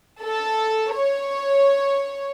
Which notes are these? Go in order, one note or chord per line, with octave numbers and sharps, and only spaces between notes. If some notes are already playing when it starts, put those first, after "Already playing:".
A4
C#5